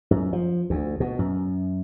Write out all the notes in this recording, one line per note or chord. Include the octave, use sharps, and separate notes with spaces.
F#2
F3
D2
B2
F#2